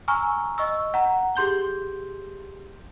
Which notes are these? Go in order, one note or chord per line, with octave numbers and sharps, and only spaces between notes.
G#5 A#5 C#6 E6 F6
D#5 C#6 E6
F#5 A#5
G4 G#4 C6 G6 G7